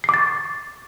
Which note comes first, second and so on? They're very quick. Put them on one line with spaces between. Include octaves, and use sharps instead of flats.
C7 D6 A6 C#6